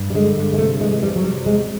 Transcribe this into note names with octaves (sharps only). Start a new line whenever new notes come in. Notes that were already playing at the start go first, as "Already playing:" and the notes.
Already playing: G2
G3
D3 G#3
G2
G#3
C3 A3
E3 G#3
G#3
F2 G3
F#3
C3 G3
E2 G#3